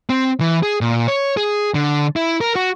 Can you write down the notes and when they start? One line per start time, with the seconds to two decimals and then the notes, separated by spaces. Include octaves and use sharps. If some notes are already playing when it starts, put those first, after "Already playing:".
0.10 C4
0.40 E3
0.63 G#4
0.81 A#2
1.08 C#5
1.37 G#4
1.74 D3
2.16 E4
2.41 A#4
2.56 F#4